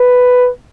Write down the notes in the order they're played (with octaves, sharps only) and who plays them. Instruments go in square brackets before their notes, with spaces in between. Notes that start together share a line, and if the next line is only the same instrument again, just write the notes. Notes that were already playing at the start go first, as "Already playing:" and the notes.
Already playing: [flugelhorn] B4